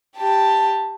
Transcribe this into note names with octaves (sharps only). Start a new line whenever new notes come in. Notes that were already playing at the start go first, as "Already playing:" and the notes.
G4 A5